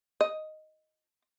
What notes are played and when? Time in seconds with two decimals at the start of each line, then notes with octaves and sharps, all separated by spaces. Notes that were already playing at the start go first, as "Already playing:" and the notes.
0.21 D#5